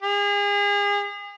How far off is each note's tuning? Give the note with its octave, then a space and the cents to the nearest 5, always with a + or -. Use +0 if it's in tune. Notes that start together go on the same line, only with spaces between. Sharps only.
G#4 -35